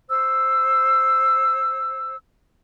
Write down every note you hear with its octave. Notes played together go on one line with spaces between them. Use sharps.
C5 E6